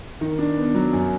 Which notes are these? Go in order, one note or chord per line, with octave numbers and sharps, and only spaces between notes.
D#3
D4
B3
F#3
F#2